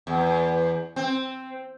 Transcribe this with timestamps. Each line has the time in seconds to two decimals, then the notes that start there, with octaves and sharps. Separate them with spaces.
0.07 E2
0.96 C4